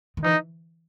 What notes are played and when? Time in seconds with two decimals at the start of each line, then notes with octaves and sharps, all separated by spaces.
0.17 D#3
0.24 E3 D#4